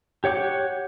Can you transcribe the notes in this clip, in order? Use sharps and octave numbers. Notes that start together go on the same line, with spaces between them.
G4 C#5 F#5 D6 G6